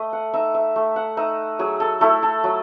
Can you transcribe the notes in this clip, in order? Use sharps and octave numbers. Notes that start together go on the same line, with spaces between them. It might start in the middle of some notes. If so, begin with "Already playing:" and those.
Already playing: A3 D#5
F#5
D#4 E5
E5
A3
F#5
D#4 E5
F#3 G#4
A4
A3 E4 A4
A4
F#3